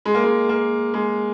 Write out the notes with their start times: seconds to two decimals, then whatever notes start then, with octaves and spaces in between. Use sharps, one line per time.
0.06 G#3
0.15 A#3
0.24 G#3
0.49 A#3
0.94 G#3